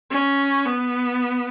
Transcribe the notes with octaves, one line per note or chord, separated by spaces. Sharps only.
C#4
B3